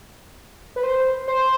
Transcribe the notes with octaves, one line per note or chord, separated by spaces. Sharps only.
B4
C5
C5